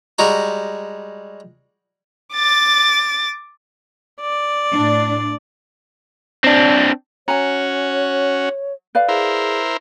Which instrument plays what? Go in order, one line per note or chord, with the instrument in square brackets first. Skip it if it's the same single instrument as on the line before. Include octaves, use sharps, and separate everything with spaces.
[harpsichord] G3 G#3 F#4 A#5
[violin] D6 A6
[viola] D5
[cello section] A2 D4
[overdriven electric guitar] C4 D4
[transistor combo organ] C#4 F#4 [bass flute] C#5 [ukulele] G#5 A#5
[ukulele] B4 D5 F5
[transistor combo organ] E4 A#4 C5 [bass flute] G#4